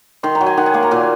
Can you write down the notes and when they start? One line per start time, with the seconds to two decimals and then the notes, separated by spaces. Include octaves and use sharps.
0.23 D#3 C6
0.35 A#5
0.41 F#3
0.46 G#5
0.57 D#3 F#5
0.66 G#5
0.74 A#3 C6
0.82 A#5
0.91 A#2 G#5